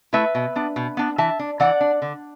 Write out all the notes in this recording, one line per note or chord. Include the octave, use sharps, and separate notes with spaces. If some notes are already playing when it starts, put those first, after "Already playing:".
A3 E4 B4 E5
B2
B3 D4
B2
B3 D4
E3 E5 A5
D4
E3 D5 F#5
D4
D3